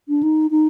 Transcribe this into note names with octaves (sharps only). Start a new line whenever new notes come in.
D4
D#4
D#4